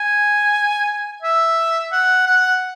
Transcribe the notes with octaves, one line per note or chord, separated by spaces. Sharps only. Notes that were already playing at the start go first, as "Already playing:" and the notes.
Already playing: G#5
E5
F#5
F#5